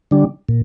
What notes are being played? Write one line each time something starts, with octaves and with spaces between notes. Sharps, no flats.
D3 G3 D4
A#2